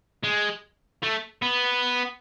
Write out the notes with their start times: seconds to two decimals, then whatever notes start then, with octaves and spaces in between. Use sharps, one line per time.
0.23 G#3
1.03 A3
1.42 B3